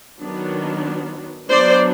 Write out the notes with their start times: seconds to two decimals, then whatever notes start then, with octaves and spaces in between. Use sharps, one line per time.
0.22 D#3 F#3 B3 D4
1.50 F#3 B3 D4 C5 D5